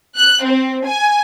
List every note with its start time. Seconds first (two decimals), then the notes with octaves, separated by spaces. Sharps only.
0.17 F#6
0.45 C4
0.86 G#5